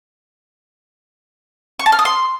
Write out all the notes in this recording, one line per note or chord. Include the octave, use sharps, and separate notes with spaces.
C#6
A5
F6
D#6
C6